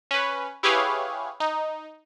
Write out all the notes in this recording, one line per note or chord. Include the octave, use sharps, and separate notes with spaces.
C#4 B4
E4 G4 G#4 B4 C#5 F5
D#4